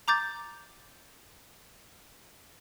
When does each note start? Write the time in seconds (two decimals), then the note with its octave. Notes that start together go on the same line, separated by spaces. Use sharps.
0.08 A#5 D6 G6 A6